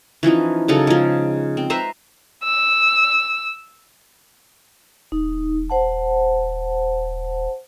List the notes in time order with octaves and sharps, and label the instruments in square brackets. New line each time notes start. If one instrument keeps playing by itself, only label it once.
[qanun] E3 F3 C#4 D#4
C#3 F#3 D#4 A4
F3 G#3
C4
B4 C5 E5 A#5
[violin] E6
[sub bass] D#1 [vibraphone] D#4
[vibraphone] C5 F#5 A5